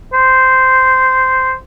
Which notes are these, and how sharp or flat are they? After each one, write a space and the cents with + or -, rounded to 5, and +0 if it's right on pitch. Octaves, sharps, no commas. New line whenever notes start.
C5 -10